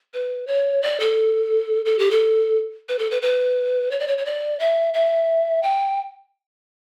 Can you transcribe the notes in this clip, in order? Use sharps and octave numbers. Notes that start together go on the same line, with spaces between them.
B4
C#5
D5
A4
A4
G4
A4
B4
A4
B4
B4
C#5
D5
C#5
C#5
D5
E5
E5
G5